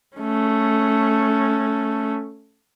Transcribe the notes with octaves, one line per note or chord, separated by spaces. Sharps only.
A3 C#4